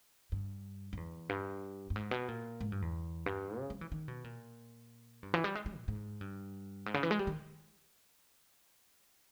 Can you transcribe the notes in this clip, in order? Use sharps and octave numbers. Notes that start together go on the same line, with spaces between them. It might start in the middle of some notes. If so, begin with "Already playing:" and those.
G2
G2
E2
G2
G2
G#2
B2
A#2
G#2
G2
E2
G2
C#3
G3
E3
D#3
B2
A#2
G2
E3
G3
G#3
G#3
A#2
G#2
G2
G#2
C#3
E3
G#3
G3
D#3